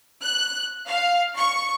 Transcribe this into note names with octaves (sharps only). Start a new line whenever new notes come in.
F#6
F5
C#6